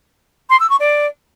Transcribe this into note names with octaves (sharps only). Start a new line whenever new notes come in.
C6
E6
C#6
D5